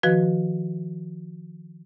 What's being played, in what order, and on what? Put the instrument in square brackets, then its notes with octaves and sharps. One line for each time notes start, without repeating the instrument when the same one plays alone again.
[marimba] D#3 F3 F#4 B4